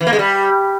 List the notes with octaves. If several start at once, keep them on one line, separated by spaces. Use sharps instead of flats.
E3
A#3
G#3
G3